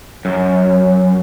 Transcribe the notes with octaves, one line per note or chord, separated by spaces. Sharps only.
F#2